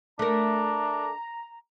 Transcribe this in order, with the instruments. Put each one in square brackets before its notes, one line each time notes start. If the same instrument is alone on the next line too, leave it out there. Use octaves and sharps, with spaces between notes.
[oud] A3 A#4 [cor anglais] D4 [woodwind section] A#5